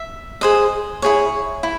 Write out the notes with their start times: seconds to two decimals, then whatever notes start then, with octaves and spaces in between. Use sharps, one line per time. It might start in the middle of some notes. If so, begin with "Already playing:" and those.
Already playing: E5
0.41 G#4 C5 D#5
1.02 E4 G#4 C#5
1.63 E4